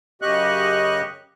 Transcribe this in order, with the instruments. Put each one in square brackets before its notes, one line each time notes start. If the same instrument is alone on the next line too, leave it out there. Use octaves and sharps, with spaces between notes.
[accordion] F#2 C#3 G4 D#5 C#6 F#6